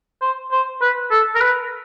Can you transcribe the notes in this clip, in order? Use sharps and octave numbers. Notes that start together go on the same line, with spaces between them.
C5
C5
B4
A4
A#4
B4